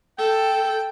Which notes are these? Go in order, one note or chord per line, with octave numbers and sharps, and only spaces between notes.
A4 G5